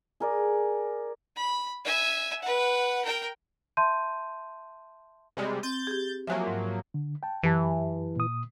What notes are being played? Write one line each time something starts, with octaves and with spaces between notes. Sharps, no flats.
G#4 A#4 D5
B5
E5 G#5
B4 F#5
A#4 G5
E5 A5 C6 G6 D#7
C3 G3 G#3
C4 G6 A6
G4 G#4
F3 F#3 A#3 E5 G#5 F#6
G#2
D3
G5 A5
F#2 E3 G4 A5
A#2 D#6